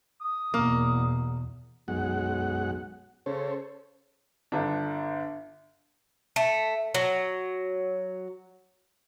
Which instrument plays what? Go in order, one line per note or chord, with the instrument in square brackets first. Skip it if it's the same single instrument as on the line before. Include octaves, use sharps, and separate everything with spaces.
[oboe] D#6
[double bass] E2 B2 [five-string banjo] A#3
[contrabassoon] B1 [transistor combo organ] F#2 G#3 F#5
[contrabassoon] C#3 [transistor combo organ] A4 C5 C#5
[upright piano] G1 D3 D4
[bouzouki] A3
F#3